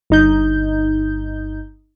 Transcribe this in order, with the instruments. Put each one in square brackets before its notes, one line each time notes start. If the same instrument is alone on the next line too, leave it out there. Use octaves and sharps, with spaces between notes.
[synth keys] G1 D#4 G6